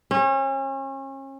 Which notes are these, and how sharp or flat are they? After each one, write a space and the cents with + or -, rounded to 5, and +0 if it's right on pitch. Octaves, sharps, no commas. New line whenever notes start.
C#4 -35